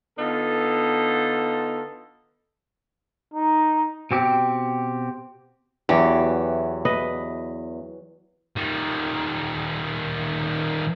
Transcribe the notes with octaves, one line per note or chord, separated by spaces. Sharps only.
D3 B3 D#4 F4 A4
D#4
B2 C4 G4
E2 E3 F#3 G4
B4 D#5
D#3 G3